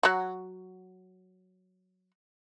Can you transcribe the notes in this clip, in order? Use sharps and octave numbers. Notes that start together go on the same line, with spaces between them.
F#3 F#4